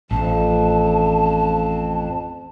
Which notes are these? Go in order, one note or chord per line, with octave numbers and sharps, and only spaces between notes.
A1 F2 A5